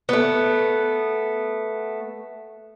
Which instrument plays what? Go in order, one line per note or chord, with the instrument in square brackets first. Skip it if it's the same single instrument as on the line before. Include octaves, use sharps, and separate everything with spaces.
[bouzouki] A3 B3